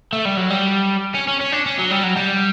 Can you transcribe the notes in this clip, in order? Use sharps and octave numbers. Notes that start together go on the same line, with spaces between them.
A3
G3
F#3
G3
C#4
C#4
C#4
D4
C#4
F#3
G3
F#3
G3